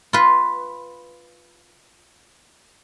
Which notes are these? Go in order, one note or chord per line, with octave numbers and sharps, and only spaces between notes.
F4 B4